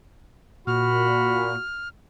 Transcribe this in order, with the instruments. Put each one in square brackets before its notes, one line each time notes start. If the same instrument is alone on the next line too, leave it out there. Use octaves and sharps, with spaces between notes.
[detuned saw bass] A#2 [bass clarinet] F#4 [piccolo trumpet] B5 [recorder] F6